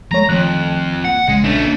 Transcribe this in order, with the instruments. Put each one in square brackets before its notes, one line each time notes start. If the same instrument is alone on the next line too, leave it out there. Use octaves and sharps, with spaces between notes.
[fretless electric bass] F3 G#3 A3 [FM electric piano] C#5 A#6 [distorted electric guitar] A#5
[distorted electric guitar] F2 [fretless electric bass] D#3 F3 A3 [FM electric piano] F#6
[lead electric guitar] F#5
[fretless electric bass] A#1 C#3 [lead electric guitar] G#3
[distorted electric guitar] A3 [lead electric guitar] D4 C#5